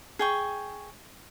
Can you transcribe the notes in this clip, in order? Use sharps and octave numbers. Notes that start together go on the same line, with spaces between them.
G#4 G5 C#6